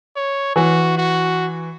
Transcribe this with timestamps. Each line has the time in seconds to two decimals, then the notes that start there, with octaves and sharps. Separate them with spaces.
0.16 C#5
0.56 E3 F#4
0.97 F#4